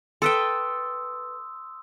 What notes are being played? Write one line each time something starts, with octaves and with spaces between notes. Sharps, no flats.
A4 B4 G5 C6 D#6 E6